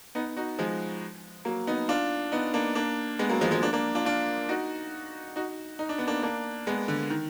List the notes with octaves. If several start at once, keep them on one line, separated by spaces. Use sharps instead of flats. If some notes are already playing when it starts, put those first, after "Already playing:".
B3 D#4
D#4 F#4
F3 G#3
F#3 A#3
B3 D#4
D4 F4
B3 D#4
A#3 D4
A#3 D4
G#3 B3
F#3 A#3
F3 G#3
F3 G#3
A#3 D4
A#3 D4
D4 F4
D4 F4
D#4 F#4
D#4 F#4
D#4
D4
B3
A#3 D4
A#3 D4
G#3 B3
D3
D#3